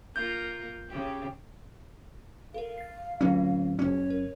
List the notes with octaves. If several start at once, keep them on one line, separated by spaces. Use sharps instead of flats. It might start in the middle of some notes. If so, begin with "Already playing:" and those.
A#3 F4 A#4 G6
C#3 G4
A4 A#4 F5
A6 C7
D1 F#3 C#4 F4
F#1 C#4 C#5
A#4